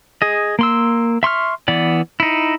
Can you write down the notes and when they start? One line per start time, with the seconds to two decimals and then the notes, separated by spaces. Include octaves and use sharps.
0.22 G#4 D#5
0.59 A#3 C6 E6
1.23 E5 C6 C#6 F6
1.68 E3 B3 D5
2.20 D#4 E4